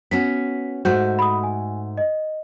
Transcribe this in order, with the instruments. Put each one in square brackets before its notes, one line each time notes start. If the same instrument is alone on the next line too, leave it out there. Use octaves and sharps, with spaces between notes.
[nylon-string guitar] B3 C#4 F#4 [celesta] B6
[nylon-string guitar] G#2 A3 F#4 [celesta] C5 G6
[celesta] B5 D#6
G#5
D#5